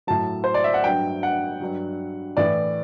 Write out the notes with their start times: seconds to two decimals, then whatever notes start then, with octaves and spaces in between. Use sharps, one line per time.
0.07 A2 F#3 A5
0.44 C5
0.54 D5
0.64 E5
0.74 F#5
0.84 G2 F#3 G5
1.23 F#5
1.61 G2 F#3
2.37 A2 E3 D5